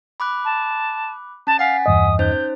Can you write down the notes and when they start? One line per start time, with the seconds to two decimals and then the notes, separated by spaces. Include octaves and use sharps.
0.20 B5 D6 F#6
0.45 A5
1.47 C#4 A5 A6
1.59 F5 F#5 G#5 B6
1.86 E2 G2 D#5 D#6
2.19 C#4 D#4 C5 G6